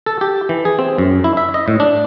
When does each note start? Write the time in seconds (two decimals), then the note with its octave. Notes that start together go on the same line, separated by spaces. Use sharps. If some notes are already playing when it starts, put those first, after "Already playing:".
0.06 A4
0.21 G4
0.49 E3
0.65 G#4
0.79 C4
0.98 F#2
1.24 E4
1.37 E5
1.54 D#5
1.68 A2
1.80 D4